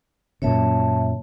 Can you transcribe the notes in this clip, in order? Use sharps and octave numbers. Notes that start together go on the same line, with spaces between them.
F#2 A#2 C#3 C#5 E5 A5